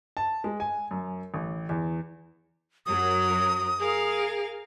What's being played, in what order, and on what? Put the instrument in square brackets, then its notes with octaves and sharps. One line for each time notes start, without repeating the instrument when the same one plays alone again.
[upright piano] A5
G#3
G#5
F#2
A1
E2
[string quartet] F#2 F#3 A#4 [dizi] D#6
[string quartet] G#4 A#4 F5